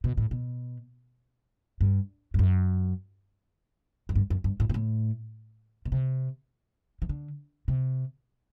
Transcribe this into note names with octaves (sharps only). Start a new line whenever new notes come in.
B2
A2
B2
G2
G2
F#2
F#2
G2
F#2
G2
A2
B2
A2
B2
C3
E3
D3
C3